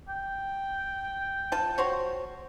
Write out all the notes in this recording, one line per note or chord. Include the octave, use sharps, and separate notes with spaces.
G5
F3 A5
F#4 C5 C#5